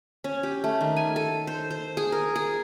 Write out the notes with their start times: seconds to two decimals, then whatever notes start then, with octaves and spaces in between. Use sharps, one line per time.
0.24 C#4
0.43 G4
0.64 A3
0.81 D#3
0.96 G#5
1.16 A4
1.47 C5
1.70 C5
1.97 G#4
2.12 A#4
2.36 G#4